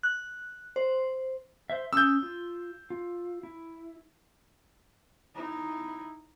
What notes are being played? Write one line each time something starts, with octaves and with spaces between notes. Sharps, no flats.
F#6
C5
C5 E5
C#4 D#6 E6 G6
F4
F4
E4
D#4 E4